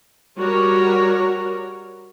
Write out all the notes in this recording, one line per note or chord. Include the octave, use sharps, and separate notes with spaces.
G3 F#4 A#4 C#5